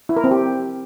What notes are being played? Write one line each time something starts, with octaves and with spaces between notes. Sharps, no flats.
E4
A#4
C4
G4